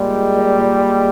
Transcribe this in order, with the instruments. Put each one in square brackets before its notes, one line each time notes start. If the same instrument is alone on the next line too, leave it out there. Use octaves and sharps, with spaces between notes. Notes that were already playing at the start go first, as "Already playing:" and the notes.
Already playing: [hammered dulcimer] A#2 G#3 [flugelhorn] G3
[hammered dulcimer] D#4
A#2
A#2
G#3